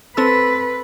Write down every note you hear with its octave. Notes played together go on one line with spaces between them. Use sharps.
C4 A4 B4 E6